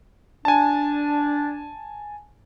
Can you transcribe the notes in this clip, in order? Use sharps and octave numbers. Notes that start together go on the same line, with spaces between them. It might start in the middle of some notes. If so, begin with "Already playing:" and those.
D4 G#5 A5